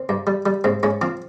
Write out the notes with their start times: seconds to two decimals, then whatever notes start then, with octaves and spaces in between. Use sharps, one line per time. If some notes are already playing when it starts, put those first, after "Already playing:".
Already playing: C4
0.09 G2
0.27 G3
0.46 G3
0.64 G#2 C4
0.83 G#2 C#4
1.02 F3 C4